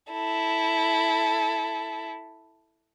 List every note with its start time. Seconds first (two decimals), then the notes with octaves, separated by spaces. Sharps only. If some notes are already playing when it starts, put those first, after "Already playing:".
0.11 E4 A4